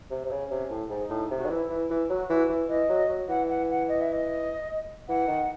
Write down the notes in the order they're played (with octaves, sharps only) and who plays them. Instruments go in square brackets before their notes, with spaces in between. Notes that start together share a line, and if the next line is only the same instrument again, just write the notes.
[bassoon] C3
C3
[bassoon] C#3 [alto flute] C#4
[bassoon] C3
A2
[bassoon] G#2 [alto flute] D#4
[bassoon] A2
C3
[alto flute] F#4
[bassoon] D#3
[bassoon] E3 [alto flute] E4
[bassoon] E3
E3
[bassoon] F#3 [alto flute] F#4
[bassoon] E3
E3
[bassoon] E3 [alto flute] D#5
[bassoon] F#3
F#3
[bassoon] E3 [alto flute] F#5
[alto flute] F#5
F#5
D#5
E5
D#5
[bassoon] E3 [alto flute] F#5
[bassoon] D#3